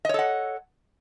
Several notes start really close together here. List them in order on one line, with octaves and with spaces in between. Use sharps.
D#5 C#5 A4 F#5